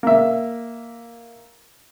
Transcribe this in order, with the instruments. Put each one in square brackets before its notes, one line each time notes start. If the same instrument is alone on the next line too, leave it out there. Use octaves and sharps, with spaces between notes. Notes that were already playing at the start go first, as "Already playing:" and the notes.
[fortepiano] A#3 E5